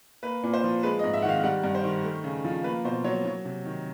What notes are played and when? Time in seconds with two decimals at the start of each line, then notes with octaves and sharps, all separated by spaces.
0.23 A#3 B4
0.43 A#2
0.53 C5
0.64 F3
0.83 G#3 B4
0.99 D#5
1.04 G#2
1.13 E5
1.22 D#3 F#5
1.29 F5
1.44 G3 F#5
1.64 G2
1.75 C5
1.84 D#3
2.04 A3
2.24 C#3
2.45 F3
2.64 A#3 B4
2.84 B2 C5
3.04 F#3 C#5
3.26 F#3
3.45 C3
3.65 D#3